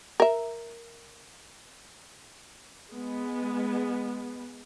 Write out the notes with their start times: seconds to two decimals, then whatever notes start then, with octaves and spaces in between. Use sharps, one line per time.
0.20 A#4 E5
2.91 G#3 B3